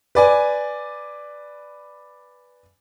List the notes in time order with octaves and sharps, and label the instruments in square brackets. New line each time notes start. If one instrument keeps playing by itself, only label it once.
[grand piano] B4 D5 G#5